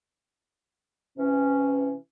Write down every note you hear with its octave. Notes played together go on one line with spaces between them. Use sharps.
C3 E3 C#4